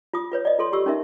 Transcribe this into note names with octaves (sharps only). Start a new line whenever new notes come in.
F4 D#6
F4 B4 C#5
D5 D#5
F4 A4 C6
F4 G4 C#6 E6
C#4 D#4 A#4 E5